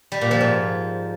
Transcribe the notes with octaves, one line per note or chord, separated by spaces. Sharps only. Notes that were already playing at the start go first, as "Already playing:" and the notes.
G3
A#2
F3
G#2